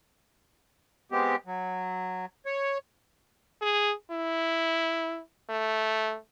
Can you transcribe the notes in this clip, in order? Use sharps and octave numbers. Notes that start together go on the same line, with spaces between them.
G#3 B3 C4 G4
F#3
C#5
G#4
E4
A3